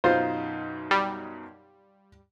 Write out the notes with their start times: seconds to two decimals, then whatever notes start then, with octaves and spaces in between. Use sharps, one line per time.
0.04 F#2 B2 D#4 F4 C5
0.91 G3